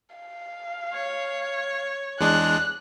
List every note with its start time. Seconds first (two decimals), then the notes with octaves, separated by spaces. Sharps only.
0.16 F5
0.94 C#5
2.21 E2 G#3 D4 F#6